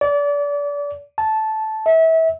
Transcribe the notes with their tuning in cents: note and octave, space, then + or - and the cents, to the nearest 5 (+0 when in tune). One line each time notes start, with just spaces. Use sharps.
D5 -30
A5 -10
E5 -30